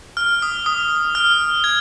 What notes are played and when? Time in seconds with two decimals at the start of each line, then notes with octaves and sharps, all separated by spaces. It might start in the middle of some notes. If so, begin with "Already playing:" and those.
0.17 F6
0.42 D#6
0.66 D#6
1.15 F6
1.64 G#6